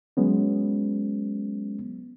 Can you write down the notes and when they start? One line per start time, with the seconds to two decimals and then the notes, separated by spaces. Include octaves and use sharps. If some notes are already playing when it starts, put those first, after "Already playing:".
0.17 F#3 G#3 B3 C#4